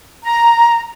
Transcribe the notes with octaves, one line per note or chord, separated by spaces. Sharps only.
A#5